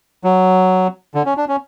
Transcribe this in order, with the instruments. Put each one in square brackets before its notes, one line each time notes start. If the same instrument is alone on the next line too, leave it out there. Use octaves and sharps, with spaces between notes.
[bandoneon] F#3
D3
C#4
D4
C#4